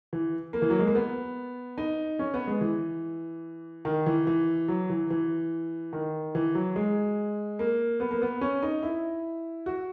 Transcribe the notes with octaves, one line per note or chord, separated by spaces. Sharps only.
E3
A#3
E3
F#3
G#3
A#3
B3
D#4
C#4
B3
G#3
E3
D#3
E3
E3
F#3
E3
E3
D#3
E3
F#3
G#3
A#3
B3
A#3
B3
C#4
D#4
E4
F#4